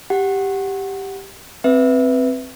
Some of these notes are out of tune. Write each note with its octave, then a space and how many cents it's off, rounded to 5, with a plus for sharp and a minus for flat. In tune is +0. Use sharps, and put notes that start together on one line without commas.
G4 +0 F#5 +0
C4 +0 B4 +0 E5 +0